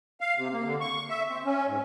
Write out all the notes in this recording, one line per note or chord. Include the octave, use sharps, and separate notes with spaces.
F5
C3
A#3
D3
C#6
E5
C4
C#4
G#2